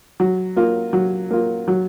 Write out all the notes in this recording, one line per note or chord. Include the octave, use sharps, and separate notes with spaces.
F#3
A#3 F4
F#3
A#3 F4
F#3